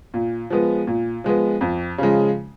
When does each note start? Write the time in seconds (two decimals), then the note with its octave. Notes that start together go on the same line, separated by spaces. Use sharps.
0.14 A#2
0.50 F3 G#3 B3
0.87 A#2
1.24 F3 G#3 B3
1.61 F2
1.98 C#3 F3 G#3